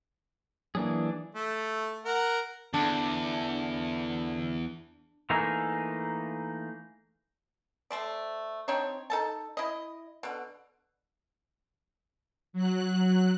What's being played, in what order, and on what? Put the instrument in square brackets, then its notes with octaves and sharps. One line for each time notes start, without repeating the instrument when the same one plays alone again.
[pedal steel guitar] E3 D4 G#4 [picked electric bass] F#3 G#3 A#3
[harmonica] A3
A#4 F#5
[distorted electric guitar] E2 [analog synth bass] D3 [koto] D4
[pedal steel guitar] E3 A3 A#3 D#4 G#4
[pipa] A3 C5 D5
C4 D4 D#4 C#5
D#4 A4 A5
E4 D#5
B2 D3
[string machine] F#3 F#6